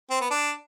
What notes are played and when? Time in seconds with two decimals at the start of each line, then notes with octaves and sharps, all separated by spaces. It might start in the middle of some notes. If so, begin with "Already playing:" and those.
0.10 C4
0.21 B3
0.31 D4